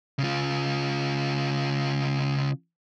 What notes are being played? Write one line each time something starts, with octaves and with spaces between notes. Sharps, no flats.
C#3 F4